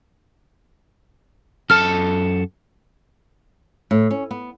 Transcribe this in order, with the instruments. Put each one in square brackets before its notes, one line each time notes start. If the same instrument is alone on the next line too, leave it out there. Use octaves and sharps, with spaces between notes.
[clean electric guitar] F#2 A4 A5 [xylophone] F6
[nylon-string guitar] A2
C#4
B3